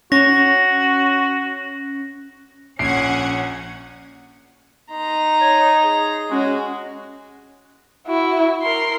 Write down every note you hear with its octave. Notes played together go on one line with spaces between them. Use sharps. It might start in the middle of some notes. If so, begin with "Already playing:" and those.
C#4 F#4 A#6
A#1 C#4 F#5 G#6 C7 D7
D#4 A#5 C6
C#5
G#4
G#3 C#4 F#4
E4 F#4
A#4 C6